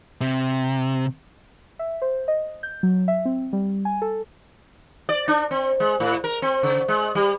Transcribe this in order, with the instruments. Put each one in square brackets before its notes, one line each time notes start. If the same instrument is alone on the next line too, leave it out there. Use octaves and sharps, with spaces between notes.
[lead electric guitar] C3
[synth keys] E5
C5
D#5
G6
F#3
E5
C4
G3
G#5
A4
[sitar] D5
D4
C4
G#3
A2
A#4
C4
C#3
G#3
G3